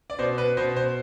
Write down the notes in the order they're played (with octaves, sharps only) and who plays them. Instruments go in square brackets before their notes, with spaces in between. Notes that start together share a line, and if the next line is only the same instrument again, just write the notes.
[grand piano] D5
B2 C5
B4
B2 C5
C5